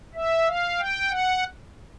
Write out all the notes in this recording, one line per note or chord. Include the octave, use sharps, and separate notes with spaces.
E5
F5
G5
F#5